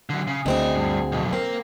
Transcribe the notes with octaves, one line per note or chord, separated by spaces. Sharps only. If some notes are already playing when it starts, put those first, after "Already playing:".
D3 F#3
C#3
D2 C4 D4 G#4 D#5
G2
B1 F2
A#3 C4 A#4